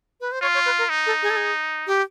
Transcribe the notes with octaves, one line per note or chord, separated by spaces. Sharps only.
B4
C5
F4 C#5
C#5
B4
A#4
D#4
A4
G#4
A4
G#4
G4